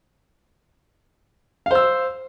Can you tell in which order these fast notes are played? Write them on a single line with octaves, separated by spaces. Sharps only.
F5 C5 E6